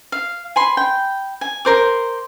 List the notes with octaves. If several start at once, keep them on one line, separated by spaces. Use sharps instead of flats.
F5
G#5 B5 C6
G5
G#5
A#4 C5 D6